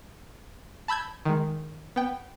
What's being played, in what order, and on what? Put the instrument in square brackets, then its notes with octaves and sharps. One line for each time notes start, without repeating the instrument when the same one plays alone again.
[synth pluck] A5 B5 E6 G6 G#6
D#3 G#3
B3 G5